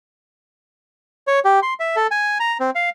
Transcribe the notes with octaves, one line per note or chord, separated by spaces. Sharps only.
C#5
G4
C6
E5
A4
G#5
A#5
C4
F5